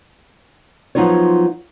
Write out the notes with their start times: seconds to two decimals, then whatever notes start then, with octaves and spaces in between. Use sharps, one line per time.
0.95 F3 F#3 B3 D#4 F4 C#5